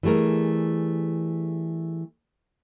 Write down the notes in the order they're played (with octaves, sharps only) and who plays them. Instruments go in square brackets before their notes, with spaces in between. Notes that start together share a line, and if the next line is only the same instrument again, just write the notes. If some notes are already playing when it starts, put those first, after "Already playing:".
[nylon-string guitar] E3 G3 A3 G#4 A#4